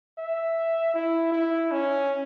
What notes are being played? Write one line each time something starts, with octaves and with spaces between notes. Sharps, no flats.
E5
E4
E4
C#4